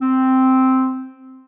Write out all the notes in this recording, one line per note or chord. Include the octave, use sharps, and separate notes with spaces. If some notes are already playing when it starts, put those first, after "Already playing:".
C4